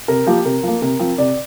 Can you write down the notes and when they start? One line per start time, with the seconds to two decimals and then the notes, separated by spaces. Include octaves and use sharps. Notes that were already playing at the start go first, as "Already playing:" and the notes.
0.08 C3 A#4
0.27 F3 A#3 G4
0.45 C3 A#4
0.63 F3 A#3
0.82 C3 A#4
0.99 F3 C4
1.18 C3 D5